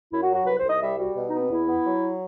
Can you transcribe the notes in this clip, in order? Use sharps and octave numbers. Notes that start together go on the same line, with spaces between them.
F#2 E4
F#4
F#3
F#4
C2 B4
C5
C2
D#5
G3 E5
G3 F#4
B2
D#4
B3
C4
E2 E4
B3
F#3